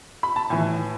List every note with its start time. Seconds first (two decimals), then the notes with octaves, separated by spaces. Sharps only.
0.23 B5
0.36 A5
0.50 A2 E3 G#5